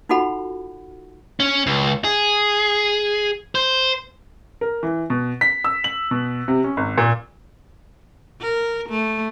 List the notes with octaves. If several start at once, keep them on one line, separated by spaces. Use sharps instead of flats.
D#4 F4 F#4 A4 F#5 B5
C#4
C#2
G#4
C5
A#4
E3
B2
B6
E6
F#7
B2
C3
C#4
G#1
A#2
A#4
A3